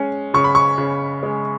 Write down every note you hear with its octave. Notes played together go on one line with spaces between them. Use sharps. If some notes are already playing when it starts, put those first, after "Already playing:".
Already playing: G#3 C#4
C#3 C#6
B5
C#6
C#3
G#3